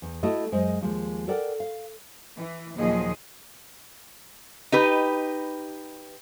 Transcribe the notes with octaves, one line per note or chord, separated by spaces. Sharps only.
E2
A3 E4 F#4 A4 D#5
F#2 G#3 C5 D#5
D#2 F3 G#3
A4 A#4 D5 F#5 G5
F5
E3
D#2 A#2 F3 F#3 G#4 D#5
D#4 G4 B4